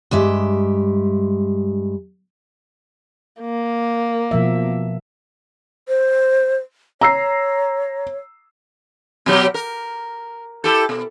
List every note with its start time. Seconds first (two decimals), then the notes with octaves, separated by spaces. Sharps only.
0.11 G2 G#3 G4 E5
3.41 A#3
4.31 B2 F3 E5
5.88 C5
7.01 C#5 A#5 E6 C7
9.26 B2 F#3 G4
9.54 A#4
10.64 E4 G4 A4
10.89 B2